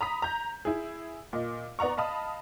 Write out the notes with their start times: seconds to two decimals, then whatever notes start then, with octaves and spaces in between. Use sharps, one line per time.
0.01 A#5 B5 D#6 B6
0.22 A#5 G6
0.65 E4 G#4
1.33 A#2 D#5
1.79 B3 D5 F#5 A#5 C#6
1.97 D#5 F5 A5 B5 D#6